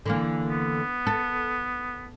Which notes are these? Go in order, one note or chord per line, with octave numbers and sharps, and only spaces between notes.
D3 E3 A#3
B3
A4